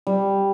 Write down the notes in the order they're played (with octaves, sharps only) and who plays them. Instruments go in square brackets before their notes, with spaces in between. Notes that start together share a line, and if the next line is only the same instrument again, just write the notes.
[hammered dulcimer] G3